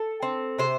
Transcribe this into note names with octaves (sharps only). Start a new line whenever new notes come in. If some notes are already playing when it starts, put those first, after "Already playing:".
Already playing: A4
C4
C3 C5